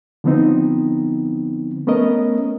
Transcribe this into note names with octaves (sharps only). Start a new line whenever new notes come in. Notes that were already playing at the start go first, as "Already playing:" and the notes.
D3 F3 B3 C4 D#4
A3 B3 C#4 A#4 D#5